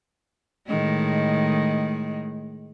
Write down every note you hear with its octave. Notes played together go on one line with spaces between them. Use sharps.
A2 D#3 G#3